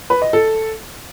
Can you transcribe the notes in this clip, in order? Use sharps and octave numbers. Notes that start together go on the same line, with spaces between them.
B4
D#5
A4